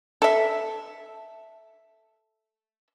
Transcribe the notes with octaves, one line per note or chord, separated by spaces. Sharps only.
A4 E5